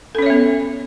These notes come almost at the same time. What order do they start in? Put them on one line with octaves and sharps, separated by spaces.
A4 C#4 C#5 E5 B3